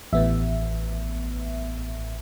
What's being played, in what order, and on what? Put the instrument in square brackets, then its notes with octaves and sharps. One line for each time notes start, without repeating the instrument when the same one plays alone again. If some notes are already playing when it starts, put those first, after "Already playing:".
[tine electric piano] A1 [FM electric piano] A2 B3 E5